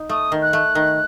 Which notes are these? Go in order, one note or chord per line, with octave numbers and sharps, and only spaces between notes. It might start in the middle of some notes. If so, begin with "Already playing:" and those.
Already playing: D#4
A3 D#6
D#3
F#6
A3
D#3